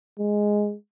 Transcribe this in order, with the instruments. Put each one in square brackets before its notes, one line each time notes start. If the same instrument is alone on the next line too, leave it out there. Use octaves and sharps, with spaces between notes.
[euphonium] G#3